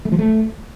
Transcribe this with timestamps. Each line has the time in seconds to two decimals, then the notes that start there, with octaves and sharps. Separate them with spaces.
0.05 A3
0.12 F3
0.19 A3